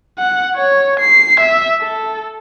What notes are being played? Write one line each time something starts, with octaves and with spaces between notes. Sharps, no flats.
F#5
C#5
C7
E5
A4